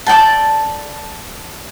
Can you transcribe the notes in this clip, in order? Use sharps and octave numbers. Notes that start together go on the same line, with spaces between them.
A4 D5 G5 A5